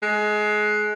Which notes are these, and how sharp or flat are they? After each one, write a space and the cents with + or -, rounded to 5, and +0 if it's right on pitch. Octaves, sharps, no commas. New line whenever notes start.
G#3 +25